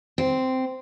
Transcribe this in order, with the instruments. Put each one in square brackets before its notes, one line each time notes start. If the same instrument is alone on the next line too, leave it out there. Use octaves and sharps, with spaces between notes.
[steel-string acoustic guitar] C4